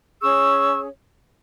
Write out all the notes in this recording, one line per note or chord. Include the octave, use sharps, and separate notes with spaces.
C#4 G#4 C#5 C#6 E6